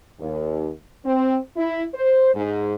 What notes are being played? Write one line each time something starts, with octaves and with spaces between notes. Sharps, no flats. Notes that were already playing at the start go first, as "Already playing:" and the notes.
D#2
C4
E4
C5
G#2